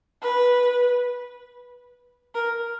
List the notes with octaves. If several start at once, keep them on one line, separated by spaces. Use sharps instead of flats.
B4
A#4